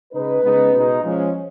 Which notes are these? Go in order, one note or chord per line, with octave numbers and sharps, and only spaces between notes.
C#3 G#3 D#4 B4
C#3 G#3 B3 D#4
B2 G#3 D#4
F3 G#3 C#4